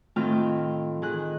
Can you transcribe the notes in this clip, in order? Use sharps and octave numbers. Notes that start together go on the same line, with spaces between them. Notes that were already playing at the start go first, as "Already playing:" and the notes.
A2 D#3 C4 F4 G5 F6
D#3 G#4 F#6